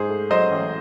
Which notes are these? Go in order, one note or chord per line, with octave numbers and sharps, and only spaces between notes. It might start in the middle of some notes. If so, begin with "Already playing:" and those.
Already playing: G#2 G#4 C5
A3
F#3 C5 D#5
A1